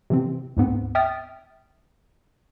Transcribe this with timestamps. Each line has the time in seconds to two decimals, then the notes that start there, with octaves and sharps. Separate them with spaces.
0.10 C3 E3 C4
0.57 D2 G#2 B3 C4
0.95 E5 G5 D#6 F6 A6